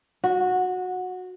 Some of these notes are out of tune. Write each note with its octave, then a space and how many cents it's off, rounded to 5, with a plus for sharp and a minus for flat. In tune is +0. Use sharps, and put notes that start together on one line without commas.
F#4 -15